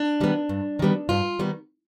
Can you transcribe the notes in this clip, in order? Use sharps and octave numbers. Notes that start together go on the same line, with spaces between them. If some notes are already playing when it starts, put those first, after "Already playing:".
Already playing: D4
D#3 G3 B3
G2
D#3 G3 B3
G2 F4
D#3 G3 B3